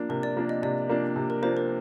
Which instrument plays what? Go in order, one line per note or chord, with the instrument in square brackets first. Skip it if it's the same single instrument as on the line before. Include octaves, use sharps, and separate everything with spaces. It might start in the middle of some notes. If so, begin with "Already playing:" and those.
Already playing: [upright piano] F3 A#3 D4
[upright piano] C3 [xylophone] A#4
[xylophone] D5
[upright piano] F3 A#3 D4
[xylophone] D#5
[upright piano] C3 [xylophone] D5
[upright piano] F3 A#3 D4
C3
[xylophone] A#4
[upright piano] F3 A#3 D4 [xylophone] C5
[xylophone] A#4